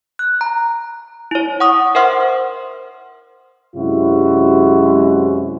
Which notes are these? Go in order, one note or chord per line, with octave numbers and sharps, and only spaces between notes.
F#6
A#5
E4 C#5
F#5 C#6 D#6
A#4 C5 E5 F#5 C6 F6
F#2 C3 G#3 E4 F#4